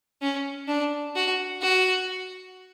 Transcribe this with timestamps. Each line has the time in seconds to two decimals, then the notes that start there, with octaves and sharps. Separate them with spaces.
0.22 C#4
0.68 D4
1.15 F#4
1.62 F#4